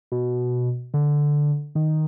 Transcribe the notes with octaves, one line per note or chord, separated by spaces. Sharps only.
B2
D3
D#3